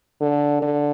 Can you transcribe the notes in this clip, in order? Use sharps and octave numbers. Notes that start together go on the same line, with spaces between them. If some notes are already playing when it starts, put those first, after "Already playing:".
D3
D3